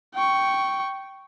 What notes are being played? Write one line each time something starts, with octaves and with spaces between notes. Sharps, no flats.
G5 C#6